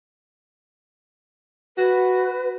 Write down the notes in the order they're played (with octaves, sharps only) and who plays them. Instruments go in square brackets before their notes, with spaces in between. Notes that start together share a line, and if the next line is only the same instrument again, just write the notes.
[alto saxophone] F#4 [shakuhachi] B4